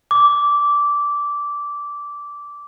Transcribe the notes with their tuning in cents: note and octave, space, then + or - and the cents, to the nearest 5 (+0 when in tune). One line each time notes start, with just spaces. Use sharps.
D6 -15